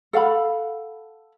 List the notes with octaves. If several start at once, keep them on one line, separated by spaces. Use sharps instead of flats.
A4 F5 F#5 B5